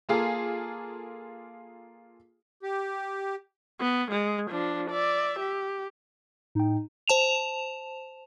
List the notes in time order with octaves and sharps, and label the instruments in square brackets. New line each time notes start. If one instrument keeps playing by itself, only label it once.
[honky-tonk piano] A#3 F4 G#4 A4
[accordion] G4
[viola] B3
G#3
F3 D4
D5 E5
G4
[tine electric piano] A2 G5 [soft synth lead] D#4
[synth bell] C5 A5 E7 F7